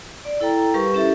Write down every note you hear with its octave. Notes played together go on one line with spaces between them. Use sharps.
D5
E4 A4 G5 A#5
G3 G4 A#4 B4 F5 C#6
C#4 E4 G4 A4 E5